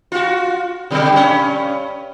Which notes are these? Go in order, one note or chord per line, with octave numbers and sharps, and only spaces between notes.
F4 F#4
B2 D3 G3
G2 C#4